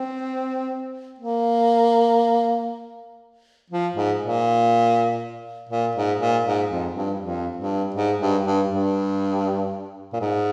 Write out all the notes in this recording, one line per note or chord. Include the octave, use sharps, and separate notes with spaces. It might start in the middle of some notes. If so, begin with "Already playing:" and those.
Already playing: C4
A#3
F3
G#2
A#2
A#2
G#2
A#2
G#2
F2
G2
F2
G2
G#2
G2
G2
G2
A#2
G#2